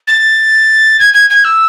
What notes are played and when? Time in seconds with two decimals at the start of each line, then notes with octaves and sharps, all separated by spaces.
0.07 A6
0.99 G#6
1.14 G#6
1.30 G#6
1.44 E6